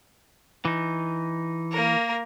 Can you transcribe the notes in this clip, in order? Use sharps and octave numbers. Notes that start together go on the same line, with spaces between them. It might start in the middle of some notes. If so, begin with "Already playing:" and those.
E3 D#4
A#3 A#4